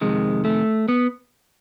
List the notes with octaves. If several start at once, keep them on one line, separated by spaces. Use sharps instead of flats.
F2 C3 D#3 G#3
A3
B3